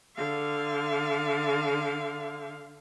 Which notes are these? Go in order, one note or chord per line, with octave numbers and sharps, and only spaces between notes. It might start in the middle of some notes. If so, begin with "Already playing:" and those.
D3 F5